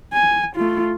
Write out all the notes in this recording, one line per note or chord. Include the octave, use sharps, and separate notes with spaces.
G#5
A3 F4